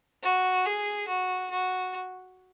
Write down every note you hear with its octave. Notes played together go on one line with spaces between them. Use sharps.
F#4
G#4
F#4
F#4